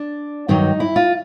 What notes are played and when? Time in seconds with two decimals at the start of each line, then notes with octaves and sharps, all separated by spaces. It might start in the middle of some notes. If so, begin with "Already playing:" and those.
Already playing: D4
0.48 G2 D#3 F#3 D#4
0.80 E4
0.96 F4